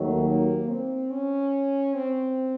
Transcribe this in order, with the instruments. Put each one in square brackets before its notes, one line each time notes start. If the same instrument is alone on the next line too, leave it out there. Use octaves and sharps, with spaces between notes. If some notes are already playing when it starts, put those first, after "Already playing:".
Already playing: [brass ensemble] D#2 D#3 F#3 [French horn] A3
[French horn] A#3
C4
C#4
C4